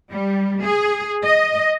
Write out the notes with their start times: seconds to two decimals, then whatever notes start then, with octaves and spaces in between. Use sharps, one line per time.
0.11 G3
0.64 G#4
1.23 D#5